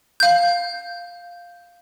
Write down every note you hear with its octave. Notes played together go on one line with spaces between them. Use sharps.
F5 G6